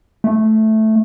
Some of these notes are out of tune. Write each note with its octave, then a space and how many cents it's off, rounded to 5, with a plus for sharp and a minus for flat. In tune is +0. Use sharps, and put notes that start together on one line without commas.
A3 -5